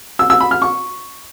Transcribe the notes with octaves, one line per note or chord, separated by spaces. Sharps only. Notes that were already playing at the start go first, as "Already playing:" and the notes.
E6
E6
B5
F6
C#6